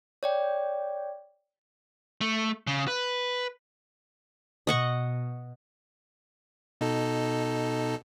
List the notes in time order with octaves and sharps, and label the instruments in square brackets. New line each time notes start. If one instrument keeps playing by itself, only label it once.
[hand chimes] C#5 D5 G5
[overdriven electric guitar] A3
C#3
B4
[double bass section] B2 [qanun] D#5 F#5 C#6
[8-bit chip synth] B2 D#4 A4